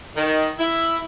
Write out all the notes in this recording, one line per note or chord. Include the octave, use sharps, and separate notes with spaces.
D#3
E4